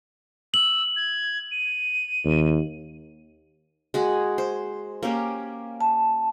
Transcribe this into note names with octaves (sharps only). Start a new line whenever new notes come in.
E6 F#7
G#6
D#7
D#2
G#3 F#4 G#4
C5
A#3 C#4 G4
A5